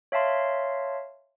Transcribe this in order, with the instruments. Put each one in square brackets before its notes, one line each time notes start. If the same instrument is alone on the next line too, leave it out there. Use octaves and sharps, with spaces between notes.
[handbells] C#5 E5 F5 A5 C6